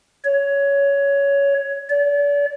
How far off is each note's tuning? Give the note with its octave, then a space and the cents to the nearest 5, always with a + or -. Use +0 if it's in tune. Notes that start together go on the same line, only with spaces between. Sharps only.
C#5 +15
D5 -40